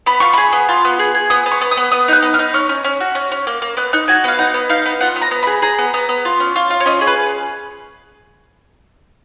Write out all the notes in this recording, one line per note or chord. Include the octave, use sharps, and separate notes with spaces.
B3 B5
F4 C#6
G#4 B5
B3
F4
B3
G#4
G#4
B3 D#6
B3
C#6
B3
D#6
B3
B3 D#6
D#4 F#6
B3
F6
D#4
C#4 F6
C#4
C#4
F#4
C#4
C#4
A#3
A#3
B3 F#6
D#4 F#6
F#4 G#5
B3 F5
D#4 F#5
B3
D#4 F5
B3
F4 F#5
B3
A#5
B3
B5
G#4
G#4 A#5
B3
B3
B3
F4
C#4
F4
F4
C#5
C#4 D#5
G#4
B4